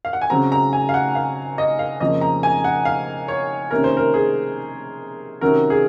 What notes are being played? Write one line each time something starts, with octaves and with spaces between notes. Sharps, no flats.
F5
F#5
G#5
C#3 F#3 C4 A#5
A#5
G#5
F5
F#5
F5
D#5
F5
F2 C#3 F3 A#3 D#5
A#5
G#5
F#5
F5
C#5
C3 D#3 A#3 C#4 A#4
C5
A#4
G#4
C3 D#3 F#3 C#4 A#4
G#4